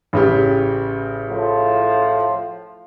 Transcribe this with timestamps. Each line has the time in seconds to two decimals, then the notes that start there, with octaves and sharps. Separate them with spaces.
0.13 A1 C#3 G4
1.31 A2 F3